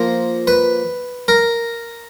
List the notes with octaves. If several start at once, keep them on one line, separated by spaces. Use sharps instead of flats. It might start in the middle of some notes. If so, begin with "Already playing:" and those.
Already playing: F3 A#3 A#4
B4
A#4